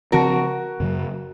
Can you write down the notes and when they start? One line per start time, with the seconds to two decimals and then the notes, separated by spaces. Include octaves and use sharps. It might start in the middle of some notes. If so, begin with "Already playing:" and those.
0.12 C#3 F3 C4 F#4 A#4
0.80 F#2 C#3 F#3